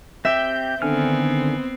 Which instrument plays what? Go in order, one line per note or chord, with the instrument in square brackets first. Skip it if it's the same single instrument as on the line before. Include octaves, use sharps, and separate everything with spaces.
[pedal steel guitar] C4 G4 [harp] E5 [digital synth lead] G6
[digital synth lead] D3 [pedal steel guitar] D#3 G#5 F6 [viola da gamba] B3 C4